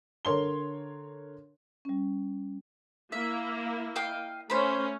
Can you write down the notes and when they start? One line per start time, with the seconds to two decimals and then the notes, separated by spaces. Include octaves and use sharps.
0.25 D3 A#4 C#5 C6 G7
1.85 G3 C#4
3.12 A#3 E4 E5
3.96 D#5 F5 G5
4.50 A3 C#4 C5 B5